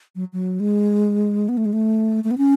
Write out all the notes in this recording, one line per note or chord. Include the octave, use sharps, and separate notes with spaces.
F#3
F#3
G#3
B3
A3
G#3
A3
A3
B3
C#4